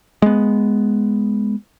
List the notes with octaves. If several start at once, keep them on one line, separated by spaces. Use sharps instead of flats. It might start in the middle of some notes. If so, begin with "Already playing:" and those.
G#3 B3